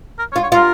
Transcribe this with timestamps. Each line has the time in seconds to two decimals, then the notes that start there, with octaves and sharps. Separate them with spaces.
0.19 A#4
0.32 C#5
0.36 F4
0.43 C#5
0.52 F4 A#4